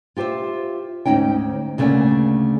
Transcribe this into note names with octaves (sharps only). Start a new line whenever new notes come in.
F4 G4 A4 C5 E5
D2 G#2 C#4 D#4 G5
D2 C#3 A3 A#3 D5 G#5